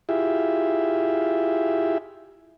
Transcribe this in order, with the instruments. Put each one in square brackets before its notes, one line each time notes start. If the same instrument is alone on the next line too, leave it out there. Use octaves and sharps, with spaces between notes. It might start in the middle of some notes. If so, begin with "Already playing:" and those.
[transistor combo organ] E4 F4 G4 G#4 E5